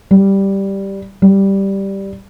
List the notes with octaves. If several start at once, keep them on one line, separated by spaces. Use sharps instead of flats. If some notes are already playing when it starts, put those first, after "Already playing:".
G3
G3